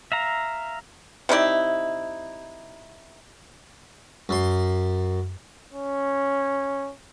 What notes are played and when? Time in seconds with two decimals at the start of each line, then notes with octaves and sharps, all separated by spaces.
0.12 E5 F5 A#5
1.29 C3 D#4 E4 D5
4.29 F#2 C6
5.72 C#4